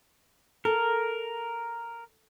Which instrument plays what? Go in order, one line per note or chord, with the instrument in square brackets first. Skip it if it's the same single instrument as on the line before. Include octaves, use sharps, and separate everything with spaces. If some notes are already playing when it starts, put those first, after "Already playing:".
[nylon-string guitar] A4 [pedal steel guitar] A#4